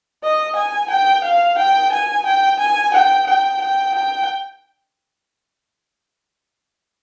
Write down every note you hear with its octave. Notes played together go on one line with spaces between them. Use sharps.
D#5
G#5
G5
F5
G5
G#5
G5
G#5
G5
G5
G5
G5